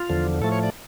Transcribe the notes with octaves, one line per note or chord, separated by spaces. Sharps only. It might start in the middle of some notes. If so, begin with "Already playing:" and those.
Already playing: F4
E2 D3 F3
A2 F3 A3 A4
C#5
D5